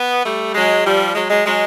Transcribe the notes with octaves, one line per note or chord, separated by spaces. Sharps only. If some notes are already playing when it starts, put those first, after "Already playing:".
Already playing: B3
G3 A3
F#3 G#3
F3 G3
F#3 G#3
F#3 G#3
F#3 G#3